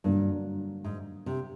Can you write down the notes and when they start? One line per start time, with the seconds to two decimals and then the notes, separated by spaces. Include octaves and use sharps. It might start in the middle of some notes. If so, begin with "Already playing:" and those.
0.04 G2 D3 F#3 A#3 D4
0.84 G#2
1.26 C3